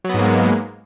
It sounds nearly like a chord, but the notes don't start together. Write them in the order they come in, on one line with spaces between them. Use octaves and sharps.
F#3 B3 G#2 A#3 G#3